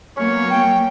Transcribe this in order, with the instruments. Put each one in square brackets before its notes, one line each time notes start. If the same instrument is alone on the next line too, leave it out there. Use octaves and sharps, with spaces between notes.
[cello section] F#3 A#3 B3 [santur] C#4 [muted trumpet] C#5
[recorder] G5